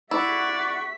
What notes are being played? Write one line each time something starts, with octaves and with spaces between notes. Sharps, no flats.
E4 D5 E5 F#5 C#6 B6